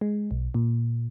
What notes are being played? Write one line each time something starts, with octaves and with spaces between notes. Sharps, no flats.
G#3
B1
A#2